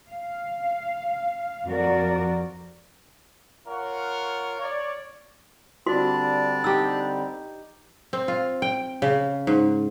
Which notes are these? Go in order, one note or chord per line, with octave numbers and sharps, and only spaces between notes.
F5
F2 F3 F#4 A#4 D5
F4 A#4 C#5 F#5
C#5 D5
D3 G3 C4 D4 F4 F#4 D5 C6
D#4 G4 E6
C4
F4
G5
C#3
G#2